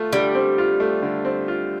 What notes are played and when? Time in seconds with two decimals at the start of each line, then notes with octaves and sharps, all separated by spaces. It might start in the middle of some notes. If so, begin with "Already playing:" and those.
Already playing: A3 F4
0.13 D3 G3
0.35 C4
0.58 F4
0.80 A3
1.03 D3
1.25 C4
1.48 F4